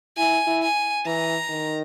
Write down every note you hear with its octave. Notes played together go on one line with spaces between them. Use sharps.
E4 G#5
E4
G#5
E3 A#5
D#3